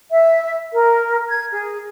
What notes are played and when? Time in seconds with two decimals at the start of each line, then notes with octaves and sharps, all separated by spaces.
0.10 E5
0.73 A#4
1.28 G#6
1.51 G#4